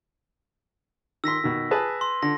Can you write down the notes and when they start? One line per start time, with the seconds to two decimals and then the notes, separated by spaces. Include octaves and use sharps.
1.24 D#3 C6 E6 A#6 B6
1.44 B2 D#3
1.71 G#4 B4 A5
2.01 C6
2.23 D3 A#6